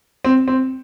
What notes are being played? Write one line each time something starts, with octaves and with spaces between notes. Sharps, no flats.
C4
C4